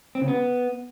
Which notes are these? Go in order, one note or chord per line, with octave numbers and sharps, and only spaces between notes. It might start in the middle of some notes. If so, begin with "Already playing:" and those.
C4
C#3
B3